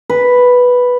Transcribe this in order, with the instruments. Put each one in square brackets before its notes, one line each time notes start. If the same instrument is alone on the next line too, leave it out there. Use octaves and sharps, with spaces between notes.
[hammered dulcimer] B4